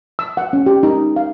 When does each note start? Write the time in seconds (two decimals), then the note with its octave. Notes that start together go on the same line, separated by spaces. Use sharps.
0.19 E6
0.37 F#5
0.53 C#4
0.66 G4
0.83 D#4
1.16 F5